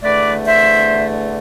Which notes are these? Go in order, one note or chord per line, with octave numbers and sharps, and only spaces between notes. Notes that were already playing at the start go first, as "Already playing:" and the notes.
E2 D3 A3 B4 D5
C5 E5